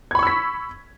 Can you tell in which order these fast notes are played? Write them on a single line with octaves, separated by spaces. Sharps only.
G#6 B5 C#6 E6 B6